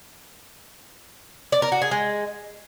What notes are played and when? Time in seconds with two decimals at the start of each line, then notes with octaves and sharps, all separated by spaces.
1.52 D5
1.62 A#4
1.72 F#4
1.82 G#4
1.91 G#3